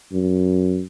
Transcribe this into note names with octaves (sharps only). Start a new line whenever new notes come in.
F#2